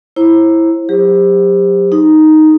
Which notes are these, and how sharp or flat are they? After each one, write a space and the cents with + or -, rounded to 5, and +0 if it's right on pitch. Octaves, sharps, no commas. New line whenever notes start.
E4 +0 C5 +35 A#5 +0
F#3 -10 G4 +30 C5 +0
D#4 +0 G#4 +0